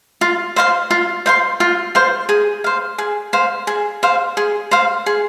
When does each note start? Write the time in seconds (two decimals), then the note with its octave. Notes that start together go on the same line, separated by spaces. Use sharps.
0.21 F4
0.56 C5 F5 C6
0.91 F4
1.26 C5 F5 C6
1.60 F4
1.95 C5 F5 C6
2.29 G#4
2.64 C5 F5
2.98 G#4
3.33 C5 F5
3.67 G#4
4.03 C5 F5
4.37 G#4
4.71 C5 F5
5.06 G#4